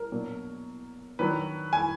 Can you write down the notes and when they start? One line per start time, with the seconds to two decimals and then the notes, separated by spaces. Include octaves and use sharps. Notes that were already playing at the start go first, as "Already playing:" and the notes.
Already playing: A#4
0.12 B2 F#3 A#3 D4
1.19 D#3 F#3 D4 B4
1.73 G#5